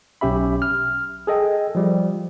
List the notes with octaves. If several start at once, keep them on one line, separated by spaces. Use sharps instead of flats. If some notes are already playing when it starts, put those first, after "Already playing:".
B1 C#4 G4 E5 B5
F6
G#4 A4 D#5 G5
F3 G3